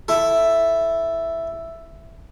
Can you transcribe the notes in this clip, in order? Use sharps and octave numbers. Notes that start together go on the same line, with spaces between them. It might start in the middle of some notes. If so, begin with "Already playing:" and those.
E4 A4